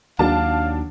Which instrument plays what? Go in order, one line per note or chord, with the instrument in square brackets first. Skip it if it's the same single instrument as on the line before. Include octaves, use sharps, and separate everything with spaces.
[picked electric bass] D#2 [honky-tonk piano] F#3 D4 A5 [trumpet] F5